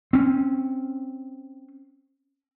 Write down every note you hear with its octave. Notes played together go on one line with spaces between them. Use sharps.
C4 C#4